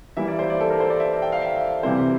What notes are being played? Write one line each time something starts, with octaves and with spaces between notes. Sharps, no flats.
E3 G3 A#3 E4 E5
D5
C5
D5
A4
A#4
C5
D5
E5
G5
F5
E5
C3 E3 G3 C4 E4 C5